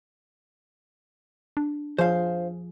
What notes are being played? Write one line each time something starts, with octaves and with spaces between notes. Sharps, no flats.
D4
F3 G#4 C5 F5